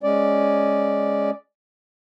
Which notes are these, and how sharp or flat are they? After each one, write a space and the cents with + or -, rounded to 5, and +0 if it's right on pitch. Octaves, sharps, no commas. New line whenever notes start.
G#3 +0 C#4 +0 D5 +0